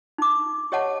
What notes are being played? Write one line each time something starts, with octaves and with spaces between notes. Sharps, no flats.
D#4 D6
G4 C#5 D#5 F#5 A5